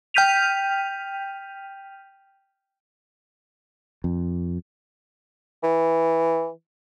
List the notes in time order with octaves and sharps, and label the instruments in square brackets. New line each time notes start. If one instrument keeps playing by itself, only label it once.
[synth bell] G5 F6 G6 B6 D#7 F7
[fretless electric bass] F2
[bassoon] E3